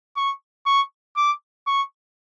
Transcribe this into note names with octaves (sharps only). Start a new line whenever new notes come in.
C#6
C#6
D6
C#6